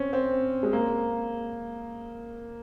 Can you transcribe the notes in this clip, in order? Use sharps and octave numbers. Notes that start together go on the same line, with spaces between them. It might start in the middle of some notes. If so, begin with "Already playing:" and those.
Already playing: C4 C#4
C4
G#3
A#3